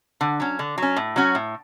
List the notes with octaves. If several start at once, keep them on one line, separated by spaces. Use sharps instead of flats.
D3
F#3 C#4
D3
F#3 C#4
A2
F#3 C#4 F#4
A2